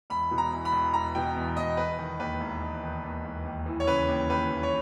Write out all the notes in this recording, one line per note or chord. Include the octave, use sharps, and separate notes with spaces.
E1 B5
B2
A#5
E2
B5
E1
E1 A#5
B2 G5
E2
E1 D#5
E1 B4
D#3
D#2 B4
E1
E1
D#3
D#2
E1
D#2
E3
C#5
C#3 B4
D#2
D#2 B4
E3
C#5